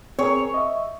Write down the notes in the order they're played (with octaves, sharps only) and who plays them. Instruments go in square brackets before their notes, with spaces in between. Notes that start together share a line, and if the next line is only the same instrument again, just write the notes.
[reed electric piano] C4 G#4 A#4 [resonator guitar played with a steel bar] C#5
[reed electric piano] D#5 E5